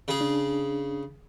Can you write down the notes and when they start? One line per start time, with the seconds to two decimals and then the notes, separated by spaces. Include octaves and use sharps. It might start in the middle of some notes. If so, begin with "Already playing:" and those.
0.08 C#3 G#4
0.21 D4